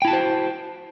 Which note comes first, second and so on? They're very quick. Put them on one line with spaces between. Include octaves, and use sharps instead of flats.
G5 E4 A5 F#4 C5